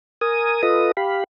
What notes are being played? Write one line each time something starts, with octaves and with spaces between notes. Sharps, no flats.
A#4 G#5 D#6
F4 A4 B4 D#5 D#6
G4 F5 B5